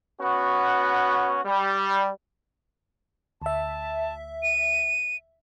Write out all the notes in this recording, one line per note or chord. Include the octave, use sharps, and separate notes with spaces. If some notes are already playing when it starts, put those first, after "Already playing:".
B3 C#4 F#4
G3
D2 E5 A5
D#7